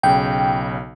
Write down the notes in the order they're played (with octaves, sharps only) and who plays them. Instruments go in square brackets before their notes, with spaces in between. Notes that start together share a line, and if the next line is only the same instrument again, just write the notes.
[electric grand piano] B1 C#3 [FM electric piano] G5